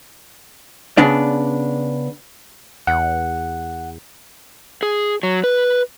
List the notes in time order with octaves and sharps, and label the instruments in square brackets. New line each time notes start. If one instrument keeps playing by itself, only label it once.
[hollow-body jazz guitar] C#3 B3 D4 D5
[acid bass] E2 [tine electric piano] F#5
[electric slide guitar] G#4
F#3
B4